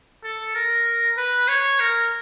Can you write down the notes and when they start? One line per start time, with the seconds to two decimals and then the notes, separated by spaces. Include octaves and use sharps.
0.24 A4
0.55 A#4
1.18 B4
1.48 C#5
1.80 A#4